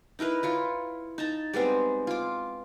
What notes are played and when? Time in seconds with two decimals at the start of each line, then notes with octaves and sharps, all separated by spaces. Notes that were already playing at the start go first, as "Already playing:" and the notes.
0.19 D#4 E4 A#4 B4
0.43 E4 F4 C#5
1.18 D#4 A5 A#5
1.53 G3 G#3 B3 C4
2.07 F4 D6